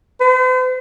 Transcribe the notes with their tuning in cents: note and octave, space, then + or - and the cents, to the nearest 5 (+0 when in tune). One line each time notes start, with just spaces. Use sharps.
C5 -45